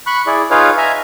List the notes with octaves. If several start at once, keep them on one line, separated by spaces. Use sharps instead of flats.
B5 C#6 F#6
E4 G#4 D5
D#4 F4 G#4 B4 C#5 F5
E5 G#5 A#5